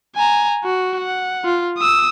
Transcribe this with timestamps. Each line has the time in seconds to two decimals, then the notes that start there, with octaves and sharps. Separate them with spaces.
0.16 G#5 A#5
0.64 F#4
0.99 F#5
1.44 F4
1.78 D#6 E6